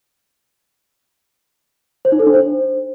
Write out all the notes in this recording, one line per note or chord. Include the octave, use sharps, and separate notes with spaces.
C5
D#4
A4
D4
C5